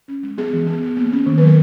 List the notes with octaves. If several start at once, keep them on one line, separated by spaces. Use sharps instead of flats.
C#4
G#3
B3 G#4
E3
B3
B3
A#3
C#4
D#3
F#3 B4
A#4